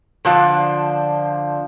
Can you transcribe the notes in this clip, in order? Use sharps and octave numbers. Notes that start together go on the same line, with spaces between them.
D3 F3 D4 C5 A5